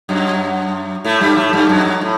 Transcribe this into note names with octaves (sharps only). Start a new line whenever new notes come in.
F#2 F#3
A2 A3
G2 G3
A2 A3
G2 G3
F#2 F#3
F#2
A2